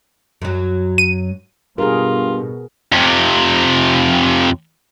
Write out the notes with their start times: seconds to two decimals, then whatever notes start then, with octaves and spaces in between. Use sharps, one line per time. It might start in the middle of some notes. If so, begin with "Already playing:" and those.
0.42 F#2 F#3
0.98 D#7
1.78 G2 B2 F4 G#4 A#4
2.93 F2 C3